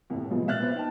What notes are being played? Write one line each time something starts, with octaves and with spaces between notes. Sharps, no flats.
C2 A2
F3 F#3 G#3 B3
A#2 E5 F6 F#6 A6
B3 C5
D#4 G5 A5